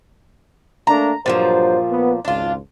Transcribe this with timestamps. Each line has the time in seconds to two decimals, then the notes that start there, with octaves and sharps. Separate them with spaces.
0.87 A3 A#3 D4 A#5
1.26 G2 A#2 D3 F3 F#3 C5
1.89 B3
2.25 G#1 C#2 D4 F4